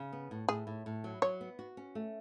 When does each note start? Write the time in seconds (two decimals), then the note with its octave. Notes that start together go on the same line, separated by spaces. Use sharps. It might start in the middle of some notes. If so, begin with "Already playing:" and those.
Already playing: C#3
0.13 B3
0.31 A2
0.48 A2 G#4
0.67 A2
0.86 A2
1.04 F#3
1.22 F#3 C#5
1.41 B3
1.59 F#4
1.77 C#4
1.95 A3